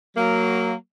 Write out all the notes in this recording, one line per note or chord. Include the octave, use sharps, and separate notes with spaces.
F#3 A#3